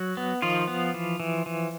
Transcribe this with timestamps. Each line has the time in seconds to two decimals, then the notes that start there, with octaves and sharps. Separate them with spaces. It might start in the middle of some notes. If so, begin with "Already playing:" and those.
Already playing: F#3 F#4
0.17 B3
0.42 D#3 F3 F4
0.68 B3
0.94 E3
1.20 E3
1.46 E3